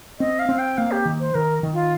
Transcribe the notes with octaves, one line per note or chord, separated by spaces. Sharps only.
C4 D#5
F5
C4
G5
A#3 F5
G4
D#3
C5
D#3 A#4
D#3
F4